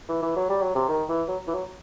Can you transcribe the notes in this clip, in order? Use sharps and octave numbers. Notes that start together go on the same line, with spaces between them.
E3
E3
F#3
G3
F#3
C3
D#3
E3
F#3
E3
F#3